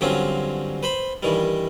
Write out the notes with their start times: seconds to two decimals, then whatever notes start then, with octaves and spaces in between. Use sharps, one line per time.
0.01 G2 D3 F#3 C4 C#4 F4
0.83 B4 C5 B5
1.23 G2 D#3 E3 G3